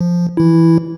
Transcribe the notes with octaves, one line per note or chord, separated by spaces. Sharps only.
F3
E3 E4